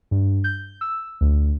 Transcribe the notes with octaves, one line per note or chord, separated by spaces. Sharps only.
G2
G6
E6
D2